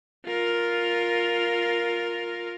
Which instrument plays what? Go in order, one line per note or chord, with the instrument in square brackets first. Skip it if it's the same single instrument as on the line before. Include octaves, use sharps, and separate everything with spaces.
[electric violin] F4 A#4